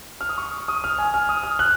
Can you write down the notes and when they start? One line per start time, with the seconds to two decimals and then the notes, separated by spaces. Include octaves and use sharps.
0.21 F6
0.29 D#6
0.38 C#6
0.68 D#6
0.84 F6
0.99 G#5
1.14 F6
1.29 D#6
1.44 F6
1.59 F#6